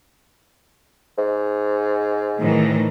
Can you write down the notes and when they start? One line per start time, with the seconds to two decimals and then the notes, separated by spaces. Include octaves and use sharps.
1.18 G#2
2.40 A2 D#3 E3